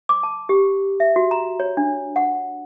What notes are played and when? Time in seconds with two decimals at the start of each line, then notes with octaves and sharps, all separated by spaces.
0.09 D6
0.23 A5
0.49 G4
1.00 E5
1.16 F#4
1.31 A#5
1.60 C#5
1.77 D4
2.16 F#5